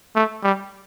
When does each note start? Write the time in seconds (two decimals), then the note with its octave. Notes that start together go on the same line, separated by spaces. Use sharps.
0.15 A3
0.43 G3